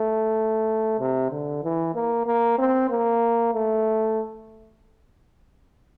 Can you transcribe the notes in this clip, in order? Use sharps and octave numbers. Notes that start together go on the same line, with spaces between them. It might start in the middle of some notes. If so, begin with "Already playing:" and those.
Already playing: A3
C3
D3
E3
A#3
A#3
C4
A#3
A3